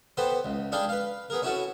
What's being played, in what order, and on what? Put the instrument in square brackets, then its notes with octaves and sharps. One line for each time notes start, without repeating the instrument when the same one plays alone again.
[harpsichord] B3 G4 A4 B4 C5
C#2
D4 G#4 A4 F5 G5 B5
B4 F5
B3 G#4 A#4
C#4 E4 F#4 A4